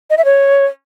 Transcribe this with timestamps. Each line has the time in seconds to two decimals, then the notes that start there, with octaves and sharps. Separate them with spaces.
0.10 D#5
0.18 E5
0.25 C#5